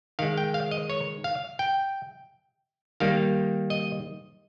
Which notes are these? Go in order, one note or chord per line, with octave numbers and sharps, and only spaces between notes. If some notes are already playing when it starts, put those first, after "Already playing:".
D#3 G#3 F5
G5
F5
D#5
C#5
F5
G5
D#3 G3 A#3 F5
D#5